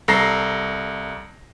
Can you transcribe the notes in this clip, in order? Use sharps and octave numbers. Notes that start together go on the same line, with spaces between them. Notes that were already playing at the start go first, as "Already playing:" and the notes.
C2 A4 A#5 A#6 C7